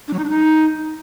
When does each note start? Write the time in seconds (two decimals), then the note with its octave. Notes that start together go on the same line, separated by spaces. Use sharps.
0.08 D4
0.13 F#3
0.19 D#4
0.24 D4
0.29 D#4